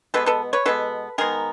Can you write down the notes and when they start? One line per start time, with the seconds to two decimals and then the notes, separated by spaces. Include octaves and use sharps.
0.14 B2 G#3 B3 A4 B4
0.26 A4 B4
0.53 B4 C#5
0.66 B2 G#3 B3 A4 B4
1.18 D#3 G#3 B3 G#4 A#4